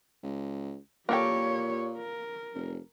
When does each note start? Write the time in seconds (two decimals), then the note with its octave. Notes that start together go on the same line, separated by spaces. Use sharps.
0.23 C#2
1.09 A#2 A#3 G4 A4 C#5 G5
1.98 A#4
2.55 F1